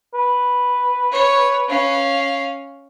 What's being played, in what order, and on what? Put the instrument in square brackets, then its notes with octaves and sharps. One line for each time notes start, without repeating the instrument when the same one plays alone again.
[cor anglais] B4
[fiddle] C#5
C#4 F5